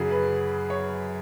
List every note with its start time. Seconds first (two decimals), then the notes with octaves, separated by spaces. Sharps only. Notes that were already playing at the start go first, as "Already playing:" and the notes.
Already playing: F#2 C#3 F#3 F#4 G#4
0.11 B4
0.70 C#5